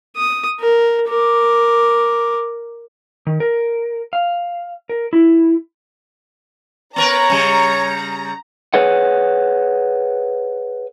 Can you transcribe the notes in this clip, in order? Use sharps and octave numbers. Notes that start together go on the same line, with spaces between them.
D#6
A#4
A#4 D6
D#3
A#4
F5
A#4
E4
B3 A#4 B4 C#5 A#5
C#3 G3
G#4 B4 C#5 F#5